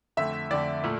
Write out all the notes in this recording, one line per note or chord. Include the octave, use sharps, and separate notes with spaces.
F2 D3 A3 E5
F2 D3 A3 D5
A#2 A3